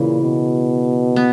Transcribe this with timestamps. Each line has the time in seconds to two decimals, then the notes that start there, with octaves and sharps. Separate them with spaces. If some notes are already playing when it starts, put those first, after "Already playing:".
Already playing: A#2 C#3 E3
0.22 B2
1.16 B3